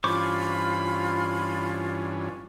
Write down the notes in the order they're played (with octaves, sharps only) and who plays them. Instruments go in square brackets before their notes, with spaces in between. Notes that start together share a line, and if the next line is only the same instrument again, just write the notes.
[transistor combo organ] G2 E3 C#4 [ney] F4 [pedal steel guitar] C5 C#6 D6 [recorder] B5